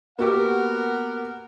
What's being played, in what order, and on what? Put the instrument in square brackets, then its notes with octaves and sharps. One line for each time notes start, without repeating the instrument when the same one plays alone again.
[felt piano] A#3 F#4 G4 [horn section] B3 A#4 F#5